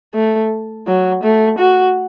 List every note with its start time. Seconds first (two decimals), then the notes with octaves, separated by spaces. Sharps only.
0.15 A3
0.87 F#3
1.23 A3
1.59 F#4